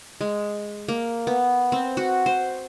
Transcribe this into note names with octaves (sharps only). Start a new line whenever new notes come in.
G#3
A#3
B3
C4
F#4
C5